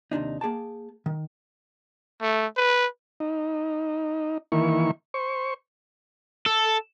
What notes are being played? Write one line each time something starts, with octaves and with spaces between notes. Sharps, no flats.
D#2 C3 D4 D#4
A#3 G#4 G5 A5
D#3
A3
B4
D#4
D#3 E3 A#3 E4 C#6
C5 C#6
A4